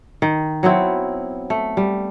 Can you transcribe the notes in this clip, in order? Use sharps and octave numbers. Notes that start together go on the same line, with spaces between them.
D#3
F#3 B3 C4 E4
A3
G3